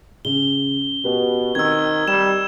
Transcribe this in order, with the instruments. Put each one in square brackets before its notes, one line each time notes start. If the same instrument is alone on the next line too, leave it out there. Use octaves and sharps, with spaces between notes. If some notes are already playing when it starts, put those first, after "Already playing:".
[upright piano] C#3 [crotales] G7
[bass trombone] B2 [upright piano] G4 B4
[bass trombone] D#3 [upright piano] C4 [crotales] E6 G#6
[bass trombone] G3 [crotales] E7